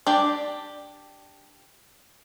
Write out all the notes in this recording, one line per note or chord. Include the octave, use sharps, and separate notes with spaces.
D4 G4 D5